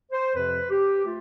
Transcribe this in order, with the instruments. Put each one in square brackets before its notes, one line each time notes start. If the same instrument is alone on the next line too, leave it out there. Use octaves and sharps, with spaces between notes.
[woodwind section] C5
F2 C3 F3 B4
G4
A3 F4